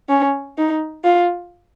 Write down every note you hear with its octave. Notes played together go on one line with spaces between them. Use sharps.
C#4
D#4
F4